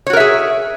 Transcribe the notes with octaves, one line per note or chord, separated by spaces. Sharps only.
F#4 G#4 A#4 C#5 E5